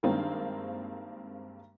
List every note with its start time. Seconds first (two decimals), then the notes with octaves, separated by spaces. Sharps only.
0.03 G2 D#3 G#3 A#3 C4 D4